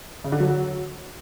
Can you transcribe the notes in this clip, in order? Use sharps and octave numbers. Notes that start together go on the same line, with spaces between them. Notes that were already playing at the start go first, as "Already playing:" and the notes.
C#3
D3
F#3